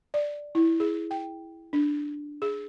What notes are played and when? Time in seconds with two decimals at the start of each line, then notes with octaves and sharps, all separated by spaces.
0.14 D5
0.55 E4
0.80 G#4
1.11 G5
1.73 D4
2.42 G#4